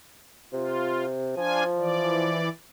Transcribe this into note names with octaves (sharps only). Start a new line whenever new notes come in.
C3 F4
F3 D4 F4 G#5
E3 D5